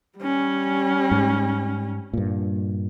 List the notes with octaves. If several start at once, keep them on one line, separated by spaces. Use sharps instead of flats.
G3 C#4
G#2
G2 A#2